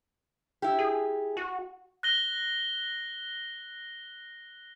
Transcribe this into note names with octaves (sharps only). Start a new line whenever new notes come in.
E4 G4
G#4
F#4
F#6 A#6 G7